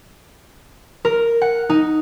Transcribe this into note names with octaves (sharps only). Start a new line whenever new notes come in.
A#4
F#5
D#4